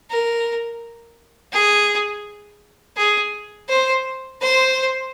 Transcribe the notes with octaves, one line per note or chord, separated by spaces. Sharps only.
A#4
G#4
G#4
C5
C5